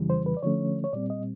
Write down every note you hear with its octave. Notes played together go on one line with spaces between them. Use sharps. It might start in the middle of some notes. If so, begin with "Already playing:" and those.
Already playing: F2 C#3 E3 G3
C5
B4
D5
D3 F3 A3 C#4 C#5
C#5
A#2 G3 C4 D5
D#5